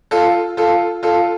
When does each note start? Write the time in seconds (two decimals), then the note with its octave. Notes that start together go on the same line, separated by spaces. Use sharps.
0.11 F4 A4
0.57 F4 A4
1.03 F4 A4